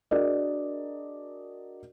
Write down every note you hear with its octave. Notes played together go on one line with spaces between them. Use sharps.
D4 F#4 G#4 A#4 D5 D#5